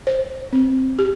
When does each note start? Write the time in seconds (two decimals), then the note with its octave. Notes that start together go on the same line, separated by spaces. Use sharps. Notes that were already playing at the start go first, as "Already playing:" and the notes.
0.07 C5
0.53 C4
0.99 G4